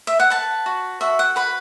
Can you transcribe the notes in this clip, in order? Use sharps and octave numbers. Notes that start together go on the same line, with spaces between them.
E5
F#5
B4 A5
F#4
F#4 E5
F#5
B4 B5